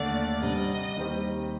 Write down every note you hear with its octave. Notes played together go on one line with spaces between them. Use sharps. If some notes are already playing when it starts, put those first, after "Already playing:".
Already playing: D#2 D3 A3 D5
C3 G3 D4 D#5
D#2 D#3 G3 C4 G4